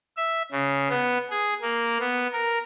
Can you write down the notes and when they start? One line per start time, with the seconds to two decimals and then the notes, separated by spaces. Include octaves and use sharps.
0.17 E5
0.52 C#3
0.90 B3
1.30 G#4
1.62 A#3
2.00 B3
2.33 A#4